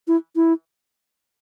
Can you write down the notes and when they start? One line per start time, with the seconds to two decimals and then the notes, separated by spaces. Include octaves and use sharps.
0.08 E4
0.36 E4